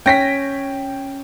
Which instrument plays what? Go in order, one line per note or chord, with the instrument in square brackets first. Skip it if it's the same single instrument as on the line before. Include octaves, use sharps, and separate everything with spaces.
[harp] C#4 [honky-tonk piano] G5 A#6 B6